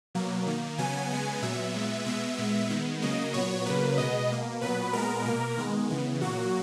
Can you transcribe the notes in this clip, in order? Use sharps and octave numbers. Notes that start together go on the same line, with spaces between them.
B2 F#3 A#3
D#3 A#3
C#3 F#3 B3 G#5
C#3 G#3 B3 G#5
A#2 F#3 B3 E5
A#2 G#3 B3
B2 G#3 B3 E5
A#2 G#3 B3
D#3 G#3 B3
C#3 F#3 A#3 D#5
A#2 F#3 B3 C#5
C#3 F#3 A#3 B4
B2 G#3 B3 D#5
B2 A#3
A#2 F#3 B3 B4
A#2 G#3 B3 A#4
B2 A#3
D#3 G#3 B3
C#3 E3 B3
A#2 F#3 A#3 F#4